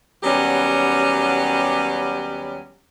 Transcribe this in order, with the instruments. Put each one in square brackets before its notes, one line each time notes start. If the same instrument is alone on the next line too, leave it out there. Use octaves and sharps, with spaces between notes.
[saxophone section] D#2 F#3 G3 B3 C#4 G4